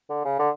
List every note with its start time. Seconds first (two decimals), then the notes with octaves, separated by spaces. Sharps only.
0.10 D3
0.25 C#3
0.39 D3